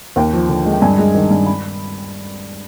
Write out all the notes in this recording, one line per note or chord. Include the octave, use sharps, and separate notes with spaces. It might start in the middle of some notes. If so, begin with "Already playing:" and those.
D#2 G5
F3
D3
G#3
G5
G2 G#5
G#3
D#3
G2
B5